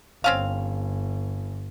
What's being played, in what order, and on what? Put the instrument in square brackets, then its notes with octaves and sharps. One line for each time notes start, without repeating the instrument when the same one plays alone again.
[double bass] G1 [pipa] C4 C#4 F5